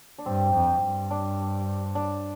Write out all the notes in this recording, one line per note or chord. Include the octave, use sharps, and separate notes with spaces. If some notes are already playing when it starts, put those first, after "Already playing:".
D4
G2 C4
F2
G2
D4
D4